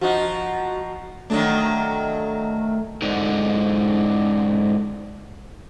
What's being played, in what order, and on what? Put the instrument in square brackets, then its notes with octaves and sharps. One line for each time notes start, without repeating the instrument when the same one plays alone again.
[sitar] F3 D#4 [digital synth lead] F#4
[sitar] D#3 F#3 D4 [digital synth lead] A3
[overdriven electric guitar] G#2 D3